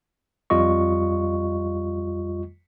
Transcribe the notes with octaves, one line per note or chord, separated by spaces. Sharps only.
F2 G3 F4 D#5 C#6